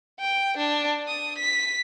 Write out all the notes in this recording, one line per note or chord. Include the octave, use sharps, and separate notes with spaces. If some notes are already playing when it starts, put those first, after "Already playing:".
G5
D4
D#6
B6